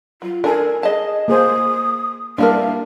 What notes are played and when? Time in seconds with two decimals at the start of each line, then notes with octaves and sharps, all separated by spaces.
0.22 F#3 F4
0.44 D4 A4 A#4 G#5
0.83 G#4 D#5 A5
1.28 A#3 G#4 C5 D#6
2.38 G3 A#3 D4 E4 A#4 F5